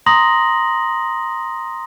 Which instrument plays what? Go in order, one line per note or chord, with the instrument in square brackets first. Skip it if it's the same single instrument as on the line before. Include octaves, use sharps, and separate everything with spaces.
[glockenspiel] A#5 C6 D#6 A#6 F#7